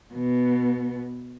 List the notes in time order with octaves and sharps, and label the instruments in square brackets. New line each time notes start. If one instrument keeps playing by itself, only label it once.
[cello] B2 B3